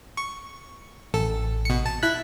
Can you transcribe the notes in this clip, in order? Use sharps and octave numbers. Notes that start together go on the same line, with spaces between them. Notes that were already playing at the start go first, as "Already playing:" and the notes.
C#6
A1 A4
B2 C#7
A5
E4 F#6 B6